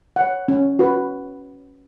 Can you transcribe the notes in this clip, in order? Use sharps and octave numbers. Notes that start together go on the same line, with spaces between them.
C#5 F#5
C#4
F#4 B4